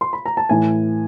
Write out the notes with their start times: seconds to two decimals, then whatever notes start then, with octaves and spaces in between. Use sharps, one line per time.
0.01 C6
0.13 B5
0.26 A#5
0.37 A5
0.49 A2 E3 G#5